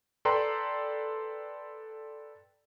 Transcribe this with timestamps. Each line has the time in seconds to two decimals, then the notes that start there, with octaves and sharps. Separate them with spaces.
0.25 A4 B4 D5 G5 A#5 C6